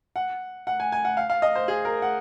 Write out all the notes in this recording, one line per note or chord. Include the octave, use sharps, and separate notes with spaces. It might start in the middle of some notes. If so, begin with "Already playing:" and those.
F#5
F#5
G#5
G#5
F#5
F5
F5
D#5
C5
G#4
A#4
F#5